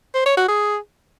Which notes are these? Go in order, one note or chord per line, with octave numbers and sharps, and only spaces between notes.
C5
C#5
F#4
G#4